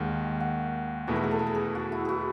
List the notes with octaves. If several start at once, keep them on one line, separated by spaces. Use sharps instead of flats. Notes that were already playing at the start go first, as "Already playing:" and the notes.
Already playing: D#2 D#3 G#3 F#5
F#5
E2 B2 A3 E4 G#4
A4
G#4
A4
G#4
A4
G#4
F#4
E4
F#4 G#4